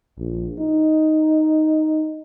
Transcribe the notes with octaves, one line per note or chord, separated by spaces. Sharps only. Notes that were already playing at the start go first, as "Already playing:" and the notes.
A#1
D#4